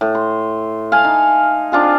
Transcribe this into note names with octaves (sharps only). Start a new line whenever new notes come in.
A2
C6
F5 G#5 A5
D#4
C4 D4 F4 G#4